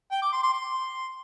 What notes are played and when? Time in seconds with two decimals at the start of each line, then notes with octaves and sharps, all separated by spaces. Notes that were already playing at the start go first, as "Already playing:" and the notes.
0.12 G5
0.22 D6
0.33 C6
0.43 C6
0.54 C6